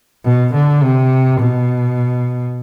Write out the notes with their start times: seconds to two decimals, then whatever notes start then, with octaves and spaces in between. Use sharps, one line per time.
0.25 B2
0.54 D3
0.83 C3
1.40 B2